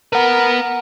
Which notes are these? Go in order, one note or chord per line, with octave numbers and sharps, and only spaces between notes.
A#4 B4 F#5